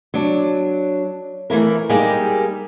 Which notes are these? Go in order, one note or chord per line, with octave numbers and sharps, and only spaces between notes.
F#3 D4
E3 A3 E4 A#4
G3 G#3 A#3 D#4 G4 G#4